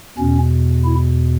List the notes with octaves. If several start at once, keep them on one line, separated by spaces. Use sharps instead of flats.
E2 B2 C#4
E4